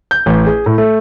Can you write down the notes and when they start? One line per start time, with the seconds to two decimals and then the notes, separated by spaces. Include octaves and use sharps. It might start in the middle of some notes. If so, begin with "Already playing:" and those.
0.11 G6
0.26 A1
0.47 G#4
0.66 A2
0.78 A3